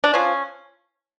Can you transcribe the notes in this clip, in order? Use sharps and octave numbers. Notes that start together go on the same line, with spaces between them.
D4
F3 C#4